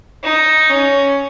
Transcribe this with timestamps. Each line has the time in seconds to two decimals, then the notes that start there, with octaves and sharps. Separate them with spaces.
0.23 D#4
0.70 C#4